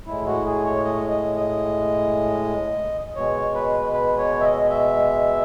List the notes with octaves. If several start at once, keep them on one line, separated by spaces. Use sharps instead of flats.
A2 G#3 E4
F#4
G#4
C#5
D#5
D#5
D#5
B2 G#3 C#5
B4
B4
C#5
E5
D#5
E5